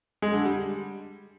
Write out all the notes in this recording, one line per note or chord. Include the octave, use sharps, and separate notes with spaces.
G#3
D3
G3